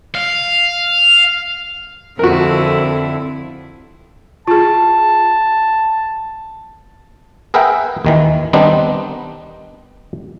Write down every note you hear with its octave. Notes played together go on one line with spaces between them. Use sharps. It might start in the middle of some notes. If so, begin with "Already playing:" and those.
F5
F2 D3 E4 F#4 A#4
F4 G#4 A5
G#4 A#4 B4 E5 F#5 G5
D#2 D#3 E3
D#3 G3 B3 C4 D4 D#4